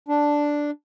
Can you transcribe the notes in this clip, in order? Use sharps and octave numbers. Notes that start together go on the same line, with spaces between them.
D4